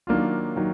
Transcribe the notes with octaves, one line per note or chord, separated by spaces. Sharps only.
D#3 F#3 A#3 D4 F4
D#3 F#3